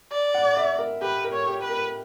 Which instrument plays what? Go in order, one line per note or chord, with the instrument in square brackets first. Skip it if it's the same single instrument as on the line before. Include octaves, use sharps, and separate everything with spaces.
[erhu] D5
[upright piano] F#5
E5
A#4
[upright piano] G4 [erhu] B4
[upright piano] A#4
[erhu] C#5
[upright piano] G4
[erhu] B4
[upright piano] A#4